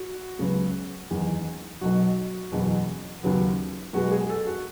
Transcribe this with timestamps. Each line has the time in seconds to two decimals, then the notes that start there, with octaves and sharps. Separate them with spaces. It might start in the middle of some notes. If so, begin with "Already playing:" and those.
Already playing: F#4
0.39 C#2 C#3 F#3 B3
1.10 F#1 E2 D#3
1.81 B1 B2 F#3 F#4
2.52 F#1 E2 B2 F#3
3.23 D#2 C#3 F#3 B3
3.93 B1 B2 G#3 B3 F#4
4.12 G#4
4.30 A4
4.46 F#4